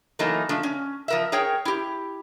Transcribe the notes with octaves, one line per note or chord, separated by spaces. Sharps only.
E3 F#3 A3 A#3 D#4
F3 A3 D4
C#4
F3 A#4 E5
G#4 A#4 C#5 G5
E4 G4